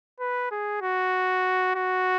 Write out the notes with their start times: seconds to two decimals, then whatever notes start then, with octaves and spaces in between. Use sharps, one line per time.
0.20 B4
0.51 G#4
0.82 F#4
1.75 F#4